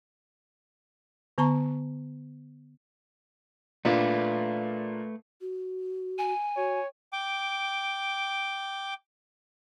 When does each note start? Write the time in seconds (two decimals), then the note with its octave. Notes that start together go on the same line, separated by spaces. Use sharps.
1.38 D3 B3 A5 A#5 C#6
3.85 A#2 A3 D4 B4 F5
5.41 F#4
6.18 G#5
6.57 F#4 C#5
7.13 G5 D6